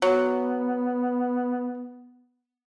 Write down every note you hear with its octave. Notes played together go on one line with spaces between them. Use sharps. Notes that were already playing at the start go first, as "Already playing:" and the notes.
F#3 B3